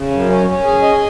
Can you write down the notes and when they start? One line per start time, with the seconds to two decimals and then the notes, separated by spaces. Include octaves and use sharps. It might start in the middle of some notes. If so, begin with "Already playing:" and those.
Already playing: C#3
0.11 F#2
0.28 C#4
0.47 C#4
0.64 G#4
0.82 D#5